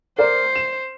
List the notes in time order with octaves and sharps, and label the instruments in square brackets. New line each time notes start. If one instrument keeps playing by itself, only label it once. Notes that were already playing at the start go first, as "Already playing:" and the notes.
[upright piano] A#4 D5 [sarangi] C5
[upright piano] E7